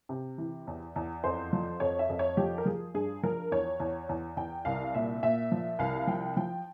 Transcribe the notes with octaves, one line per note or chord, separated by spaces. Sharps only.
C3
E3
E2
E2
F2 C5
F3
F2 C#5
E5
F2
C#5
F3 G4
A#4
F3 G#4
G2 G#4
F3 A#4
E2 C#5
E2
E2
E2 G5
C2 F5
A#2 E5
A#2 E5
F3
C2 F5
F3 G5
F3 G5